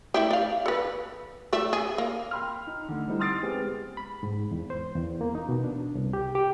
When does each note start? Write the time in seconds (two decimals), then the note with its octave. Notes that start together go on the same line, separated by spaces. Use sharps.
0.14 A3 E4 G4
0.31 D5 F5
0.66 A4 B4
1.53 A3 D5 E5
1.73 G#4
1.98 A#3
2.31 G5 B5 C6 F6
2.67 D#4
2.88 D3 A3
3.08 G3 C4 D#4 E4 A4
3.19 C6 D#6 F6 A6 C7 D7
3.43 G#3 B3 C4 G4 G#4
3.97 B5
4.23 G#2
4.51 E2
4.70 C5
4.95 E2
5.21 A#3
5.35 D#4
5.49 B2
5.64 D4
5.95 C2
6.13 G4
6.35 G4